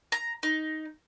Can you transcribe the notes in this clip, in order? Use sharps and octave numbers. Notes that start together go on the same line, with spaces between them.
A#5
D#4